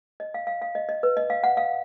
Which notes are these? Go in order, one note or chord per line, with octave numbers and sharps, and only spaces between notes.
D#5
F5
F5
F5
D#5
D#5
B4
D#5
F5
F#5
F5